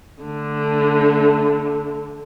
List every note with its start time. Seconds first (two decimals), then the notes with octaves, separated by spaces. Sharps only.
0.23 D3 A3